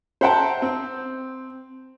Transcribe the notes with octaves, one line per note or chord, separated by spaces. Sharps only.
C5 E5 F#5 G5 A5 A#5
C4